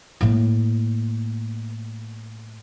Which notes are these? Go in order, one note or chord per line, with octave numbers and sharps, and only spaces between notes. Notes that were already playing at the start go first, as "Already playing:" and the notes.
A2 A#3